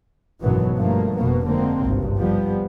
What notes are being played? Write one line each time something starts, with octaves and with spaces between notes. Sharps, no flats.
G#1 F#2 B2 E3 F#3 B3
G2 F3 A3 A#3
F1 B2 A#3 B3
D3 F3 G#3 A#3 C4
G#1 C#2 G2 C3
F3 G3 B3